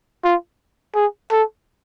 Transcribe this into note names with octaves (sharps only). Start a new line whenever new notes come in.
F4
G#4
A4